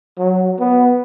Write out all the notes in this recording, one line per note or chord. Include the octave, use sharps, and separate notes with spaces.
F#3
B3